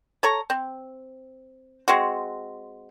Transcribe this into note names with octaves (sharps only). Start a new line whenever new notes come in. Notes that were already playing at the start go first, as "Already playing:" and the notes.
A4 C#5 A#5
C4
G#3 C4 F#4